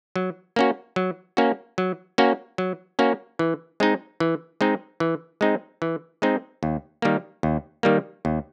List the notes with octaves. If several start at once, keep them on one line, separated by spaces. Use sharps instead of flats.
F#3
A#3 C#4 F#4
F#3
A#3 C#4 F#4
F#3
A#3 C#4 F#4
F#3
A#3 C#4 F#4
E3
G#3 C4 D#4
E3
G#3 C4 D#4
E3
G#3 C4 D#4
E3
G#3 C4 D#4
D#2
D#3 G3 A#3
D#2
D#3 G3 A#3
D#2